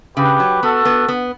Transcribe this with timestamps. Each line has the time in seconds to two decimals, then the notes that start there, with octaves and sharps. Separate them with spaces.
0.17 C#3 G4 B4
0.40 F#3
0.62 B3 F#4 A4
0.85 B3
1.08 B3